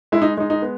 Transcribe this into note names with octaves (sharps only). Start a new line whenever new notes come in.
G#3 E4
D#4
G#3 D#4
D#4
B3